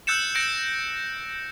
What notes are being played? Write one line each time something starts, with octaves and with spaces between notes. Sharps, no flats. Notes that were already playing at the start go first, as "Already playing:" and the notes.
E6 F#6 G6 A6 C#7 E7
G6 A#6 C#7 D7